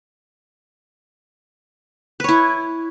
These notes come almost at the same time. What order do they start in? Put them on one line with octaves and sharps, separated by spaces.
B4 C#5 E4